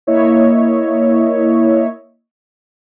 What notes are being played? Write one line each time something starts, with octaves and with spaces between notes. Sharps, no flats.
A#3 E4 C#5 D#5 E5